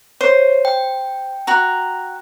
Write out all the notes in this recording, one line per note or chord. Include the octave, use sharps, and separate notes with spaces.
C5 C#5
G5
F#4 A#5